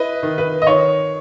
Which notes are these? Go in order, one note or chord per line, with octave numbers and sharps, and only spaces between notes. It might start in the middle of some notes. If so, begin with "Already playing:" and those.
Already playing: E4 B4 D#5
D#3
B4
D#5
D#3 C#5